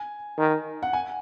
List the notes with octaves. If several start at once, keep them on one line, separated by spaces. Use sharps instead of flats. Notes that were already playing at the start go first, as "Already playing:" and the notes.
Already playing: G#5
D#3
F#5
G#5